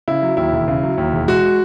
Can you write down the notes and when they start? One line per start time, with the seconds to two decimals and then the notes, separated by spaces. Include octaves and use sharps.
0.08 C#3 E4
0.22 F#3
0.37 D#2 E4
0.52 E1
0.68 C#3
0.83 F#3
0.98 D#2
1.13 E1
1.28 G#3 F#4